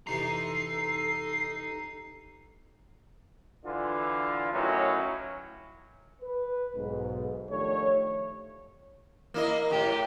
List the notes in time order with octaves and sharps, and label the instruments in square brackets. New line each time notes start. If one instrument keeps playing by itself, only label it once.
[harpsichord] F2 C3 E3 [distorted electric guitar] D#4 A#5 [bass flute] A4 [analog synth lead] C7
[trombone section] D3 E3 F4
A2 D#3 F#3 C#4
[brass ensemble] B4
B1 G#2
D#3 F3 A3 D4 G4 C#5
[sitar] A#3 E4 D#5 [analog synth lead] A#4
[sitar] D#2 A2 [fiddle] G4